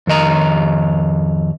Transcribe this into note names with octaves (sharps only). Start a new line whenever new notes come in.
F2 D#3 D#5 A#5